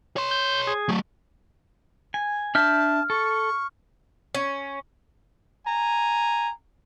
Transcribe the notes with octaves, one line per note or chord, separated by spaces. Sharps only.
C#5 C6
G6
G#4
F#3 A3
G#5
D4 E5 A5 F6 G6
A4 C#6
C#4
G#5 A#5